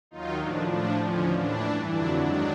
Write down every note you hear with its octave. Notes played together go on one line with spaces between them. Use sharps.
D#2 D#3 F#3 D#4 F4
A2 F3 D4
A2 F3 D4
D#2 D3 F3 C#4
A2 E3 D4
G2 E3
F2 D3 F#3 D4 E4
G#2 D#3 F#3 D4